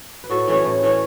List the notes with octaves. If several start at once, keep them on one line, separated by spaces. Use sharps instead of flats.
B4
A2 F#4 A4
E3 A3 C#4
A2
E3 A3 C#4